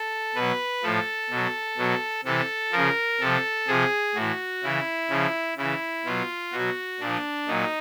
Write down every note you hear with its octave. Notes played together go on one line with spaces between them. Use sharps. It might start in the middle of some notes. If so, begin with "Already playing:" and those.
Already playing: A4
B2 F#3 B4
A2 F3 A4
B2 F#3
B2 F#3
C3 E3 A4
C#3 F3 A#4
C3 F3 A4
C3 F3 G#4
A2 E3 F#4
C#3 E3 E4
C#3 F3
C#3 E3 E4
B2 F#3 F4
B2 F#3 F#4
A#2 F3 D4
A#2 F#3 D#4